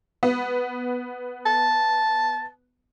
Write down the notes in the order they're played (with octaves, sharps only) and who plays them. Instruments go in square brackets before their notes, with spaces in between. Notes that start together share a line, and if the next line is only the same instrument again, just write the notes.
[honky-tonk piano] B3
[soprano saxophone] A5